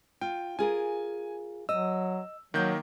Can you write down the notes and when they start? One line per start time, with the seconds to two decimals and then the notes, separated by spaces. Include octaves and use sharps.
0.21 F4 G5
0.59 F4 G#4 A#4 G#5
1.69 F#3 D#5 E6
2.54 D#3 F#3 A#3 G6